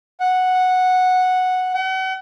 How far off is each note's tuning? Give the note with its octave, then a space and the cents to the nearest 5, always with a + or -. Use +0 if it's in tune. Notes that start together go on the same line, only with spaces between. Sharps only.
F#5 -5
F#5 +40